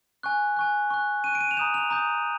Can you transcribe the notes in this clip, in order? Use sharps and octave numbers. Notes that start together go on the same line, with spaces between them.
G#5 C#6 F#6
G#5 C#6 F#6
C#6 F#6
C#6 F#6 D#7
D7
D#7
F7
A#5 D#6 G6 E7
F7
A#5 D#6 G6